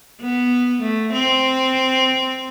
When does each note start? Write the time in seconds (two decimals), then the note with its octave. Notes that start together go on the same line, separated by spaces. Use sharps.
0.21 B3
0.82 A3
1.13 C4